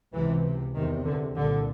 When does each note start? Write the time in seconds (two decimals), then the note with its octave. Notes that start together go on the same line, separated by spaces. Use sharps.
0.13 C#2 C3 E3
0.74 E2 C3 D#3
1.05 D3
1.35 C2 A#2 D3